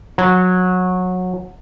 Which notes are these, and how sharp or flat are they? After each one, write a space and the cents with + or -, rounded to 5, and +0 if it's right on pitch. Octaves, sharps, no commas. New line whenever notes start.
F#3 -20